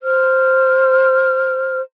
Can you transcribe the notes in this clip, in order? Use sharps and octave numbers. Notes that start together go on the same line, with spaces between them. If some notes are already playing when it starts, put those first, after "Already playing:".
C5 F6